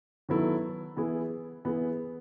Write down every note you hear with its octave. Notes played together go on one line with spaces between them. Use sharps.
D#3 F#3 B3 E4 A4
E3 B3 E4 G#4
E3 B3 E4 G#4